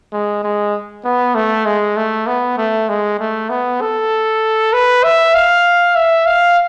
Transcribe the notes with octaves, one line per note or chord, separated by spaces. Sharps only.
G#3
G#3
B3
A3
G#3
A3
B3
A3
G#3
A3
B3
A4
B4
E5
F5
E5
F5